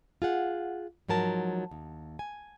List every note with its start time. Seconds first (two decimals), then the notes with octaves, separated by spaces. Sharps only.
0.22 F4 G#4 F#5
1.08 G#2 F3 F#3 A#4 A5
1.71 D#2
2.19 G#5